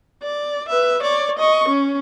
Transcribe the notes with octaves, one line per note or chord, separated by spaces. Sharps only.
D5
B4 E5
C#5 D5
D#5 C#6
C#4